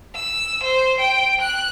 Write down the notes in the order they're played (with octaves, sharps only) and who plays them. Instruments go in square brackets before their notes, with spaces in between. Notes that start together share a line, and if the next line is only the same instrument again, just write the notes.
[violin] E6
C5
G5
F#6